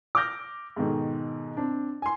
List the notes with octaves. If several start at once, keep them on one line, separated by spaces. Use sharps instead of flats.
D6 E6 F6 G6 A#6
G#2 B2 D#3 A4
C4 D4
G#5 C6